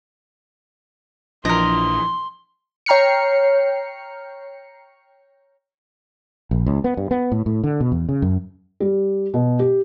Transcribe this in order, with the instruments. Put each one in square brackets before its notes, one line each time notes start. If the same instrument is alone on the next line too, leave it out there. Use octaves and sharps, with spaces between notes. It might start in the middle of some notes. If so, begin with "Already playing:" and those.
[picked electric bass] A#1 D4 [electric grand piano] E3 F3 [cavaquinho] A#4 D#5 [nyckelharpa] C6
[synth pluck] C#5 G5 A#5 F6 C7 C#7
[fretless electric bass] A#1
C#2
B3
G2
B3
A2
A2
D3
B2
E2
C#3
F#2
[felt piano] G3
B2
G4